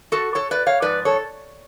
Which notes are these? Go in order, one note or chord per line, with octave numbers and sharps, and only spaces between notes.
F#4 A4
A4 C#5
B4 D5
C#5 F5
G#2 F3 B4 D5
A4 C#5